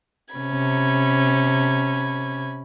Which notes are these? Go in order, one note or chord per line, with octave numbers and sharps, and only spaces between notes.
C3 C#4 B5 G#6